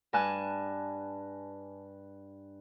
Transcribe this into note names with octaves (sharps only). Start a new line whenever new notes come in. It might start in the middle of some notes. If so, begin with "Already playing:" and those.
G2 G#5 A5 F#6